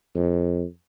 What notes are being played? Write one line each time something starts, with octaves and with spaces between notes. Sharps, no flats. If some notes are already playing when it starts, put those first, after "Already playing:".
F2